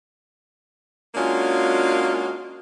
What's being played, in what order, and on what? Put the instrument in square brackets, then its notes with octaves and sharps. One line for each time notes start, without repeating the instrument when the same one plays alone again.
[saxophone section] G#3 A#3 C#4 D4 F4 F#4